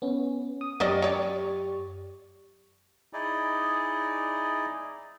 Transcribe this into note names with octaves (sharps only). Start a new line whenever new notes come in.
B3 C#4
D#6
F#2 C#4 G4 D5 D#5 C#6
C#5 D5
D#4 E4 G#4 D5 D#5